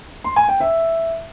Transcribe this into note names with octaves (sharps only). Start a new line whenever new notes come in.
C6
G#5
G5
E5